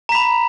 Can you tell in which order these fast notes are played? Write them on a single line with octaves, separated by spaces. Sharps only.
A#5 B6 B5